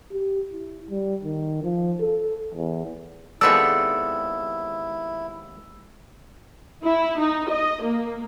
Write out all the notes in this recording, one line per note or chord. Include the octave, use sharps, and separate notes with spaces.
G4
E4
G3
D#3
F3
A4
E2
D#2 G#3 B3 C4 E4 A4 D5 E6
E4
D#4
D#5
A#3